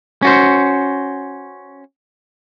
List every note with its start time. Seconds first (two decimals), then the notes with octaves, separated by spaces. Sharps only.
0.22 C#4 F#4 C5